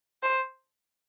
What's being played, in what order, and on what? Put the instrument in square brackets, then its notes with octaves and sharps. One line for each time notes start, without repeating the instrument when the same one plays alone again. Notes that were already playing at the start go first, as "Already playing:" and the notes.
[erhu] C5